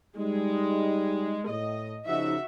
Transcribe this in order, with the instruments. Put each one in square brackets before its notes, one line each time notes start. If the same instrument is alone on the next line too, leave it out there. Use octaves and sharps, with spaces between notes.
[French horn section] G3 D#4 [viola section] G#3
[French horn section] A2 [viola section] D#5
[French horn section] C#3 F3 D#4 [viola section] F#4 E5